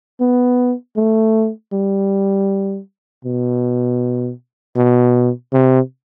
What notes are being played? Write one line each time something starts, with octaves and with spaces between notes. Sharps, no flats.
B3
A3
G3
B2
B2
C3